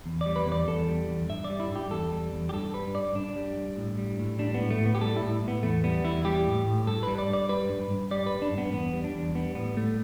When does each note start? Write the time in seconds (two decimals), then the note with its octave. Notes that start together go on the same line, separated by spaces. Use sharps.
0.06 E2
0.21 G3 D5
0.36 B4
0.46 E2
0.52 D5
0.68 E2 A4
0.88 G3
1.09 E2
1.29 G2 E5
1.45 D5
1.50 G3
1.60 E4
1.70 G2
1.76 G4
1.91 E2 A4
2.12 G3
2.32 E2
2.49 G4
2.53 G2 A4
2.74 G3 B4
2.94 G2 D5
3.15 G2 D4
3.36 G3
3.57 G2
3.77 A2
3.98 G3
4.19 A2
4.39 G3 D4
4.54 B3
4.60 A2
4.70 A3
4.80 A2
4.86 B3
4.95 G4
5.01 G3 A4
5.17 E4
5.22 A2
5.43 A2
5.48 B3
5.63 E2 A3
5.84 G3 B3
6.04 E2 E4
6.25 G3 G4
6.46 A2
6.66 A2
6.86 G2 A4
7.03 G3 B4
7.18 D5
7.28 G2
7.33 D5
7.49 G3 B4
7.70 G2
7.90 G2
8.11 G3 D5
8.26 B4
8.32 G2
8.42 D4
8.52 G2
8.58 B3
8.73 E2 B3
8.94 G3
9.04 D4
9.14 E2
9.35 G3 B3
9.55 A2 B3
9.76 A2 A3